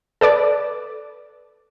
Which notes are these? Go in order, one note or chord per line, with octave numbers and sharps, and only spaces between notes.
A4 B4 D5 D6